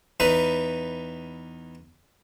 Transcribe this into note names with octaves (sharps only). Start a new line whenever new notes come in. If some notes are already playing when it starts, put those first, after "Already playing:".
E2 D#4 B4